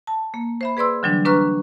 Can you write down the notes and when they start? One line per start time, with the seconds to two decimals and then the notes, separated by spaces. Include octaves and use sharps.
0.07 A5
0.34 A#3
0.61 C5 E5 B5
0.77 G#4 B4 D5 C6 E6
1.03 D3 E3 F#3 G3 D4
1.25 D4 B4 A#5 C#6 F6 F#6